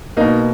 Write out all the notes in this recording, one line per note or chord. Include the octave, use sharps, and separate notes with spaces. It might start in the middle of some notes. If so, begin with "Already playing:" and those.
B2 A#3 D#4